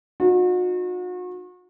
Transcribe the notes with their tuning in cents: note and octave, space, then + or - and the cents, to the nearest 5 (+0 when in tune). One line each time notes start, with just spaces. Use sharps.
D#4 -20 F#4 -40